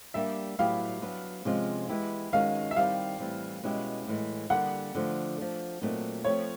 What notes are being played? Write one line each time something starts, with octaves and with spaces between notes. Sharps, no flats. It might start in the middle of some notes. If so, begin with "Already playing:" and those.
G3 A#3 D4 G4 E5
A2 F#3 B3 E4 G4 F5
F#3 B3 D4
C3 F3 G#3 C#4 F4
E3 G#3 B3 E4 G4
D#3 G#3 C#4 F#4 F5
E5
D#3 G3 C4 E4 G4 F5
A2 E3 G3 C4
B2 G#3 C#4 E4 G4
A2 E3 G#3
D3 G3 A#3 F#5
D3 F3 A3
F3 A3 D4
A#2 F#3 A3 C4 D#4
F3 A3 C4 C#5